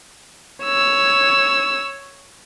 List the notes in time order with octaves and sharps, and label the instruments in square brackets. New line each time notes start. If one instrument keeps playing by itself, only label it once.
[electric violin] C#5 E6